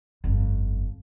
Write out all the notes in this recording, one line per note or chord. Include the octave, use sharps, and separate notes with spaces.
G1 F2